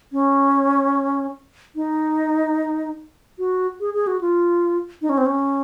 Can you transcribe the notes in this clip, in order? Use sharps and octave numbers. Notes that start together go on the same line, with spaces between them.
C#4
D#4
F#4
G#4
G#4
F#4
F4
D#4
C#4
C4
C#4